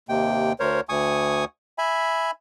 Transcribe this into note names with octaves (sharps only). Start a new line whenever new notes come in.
D#2 C3 G5
D2 A#4 C5 C#5
D2 G#5 C#6 D#6
E5 G#5 B5